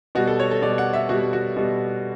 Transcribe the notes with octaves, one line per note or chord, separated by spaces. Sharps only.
B2 G3 F#4
A4
C#5
A4
B2 G3 D5
F#5
E5
B2 G3 F#4
F#4
B2 G3